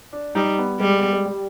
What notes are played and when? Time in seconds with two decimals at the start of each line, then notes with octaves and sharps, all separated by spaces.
0.13 D4
0.35 G3 D#4
0.58 B3
0.80 G3 G#3
0.99 B3
1.13 G#3
1.26 G3